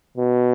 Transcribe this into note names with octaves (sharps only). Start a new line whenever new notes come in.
B2